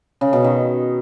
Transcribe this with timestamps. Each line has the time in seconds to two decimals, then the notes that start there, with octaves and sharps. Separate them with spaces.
0.21 C#3
0.33 B2
0.44 D#3